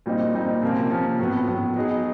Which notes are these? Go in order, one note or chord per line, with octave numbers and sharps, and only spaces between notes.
A#2 G3 C4 D#4
A#2 G3 C4 D#4
C3 F3 A#3 C#4
C3 F3 A#3 C#4
A2 F#3 B3
A2 F#3 B3
F#3 B3 D#4 G#4